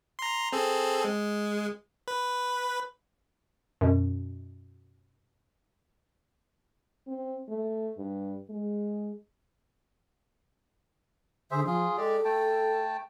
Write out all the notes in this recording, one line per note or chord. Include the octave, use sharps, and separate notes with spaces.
A#5 C6
C4 G#4 A4
G#3
B4
F#2 B2
C4
A3
G2
G#3
D3 G#4 C5 E5
F3 F4 G#4
G#3 G4 A4 D5
A3 G5 A5